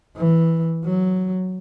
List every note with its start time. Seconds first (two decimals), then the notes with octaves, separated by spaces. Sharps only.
0.16 E3
0.85 F#3